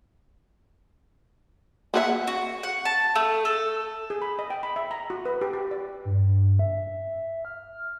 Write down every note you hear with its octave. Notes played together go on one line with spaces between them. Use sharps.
A#3 G#4 E5 F#5
F#4
F#5
A5
A3
A4
G#4
B5
D#5
G5
B5
E5
A#5
F#4
B4
G4
G4
D5
G2
E5
F6